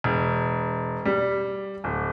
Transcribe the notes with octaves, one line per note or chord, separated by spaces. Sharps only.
E1
G3
D1